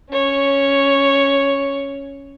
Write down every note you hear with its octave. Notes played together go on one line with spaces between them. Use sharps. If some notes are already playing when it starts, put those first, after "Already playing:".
C#4 C#5